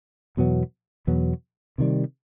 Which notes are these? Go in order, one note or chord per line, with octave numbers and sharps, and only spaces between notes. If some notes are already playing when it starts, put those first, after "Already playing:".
E2 B2 F#3 B3
E2 B2 F#3 B3
C3 D#3 G3